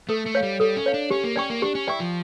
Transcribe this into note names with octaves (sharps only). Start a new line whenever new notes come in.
A3 A4
A3
C#5 F5
G3
G3 A4
C#4
C#5 F5
D4
C#4 G4
A#3
C#4 D5 G5 C#6
A#3
D4 G4
C#4
E4 D5 G5 C#6
F3